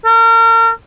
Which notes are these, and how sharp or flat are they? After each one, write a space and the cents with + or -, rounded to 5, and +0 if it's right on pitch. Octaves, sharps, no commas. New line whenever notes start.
A#4 -35